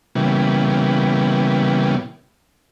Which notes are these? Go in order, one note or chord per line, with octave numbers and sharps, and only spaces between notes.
A#2 C#3 E3 G3 B3